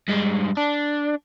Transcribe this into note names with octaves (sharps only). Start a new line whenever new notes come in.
G2 G#3
D4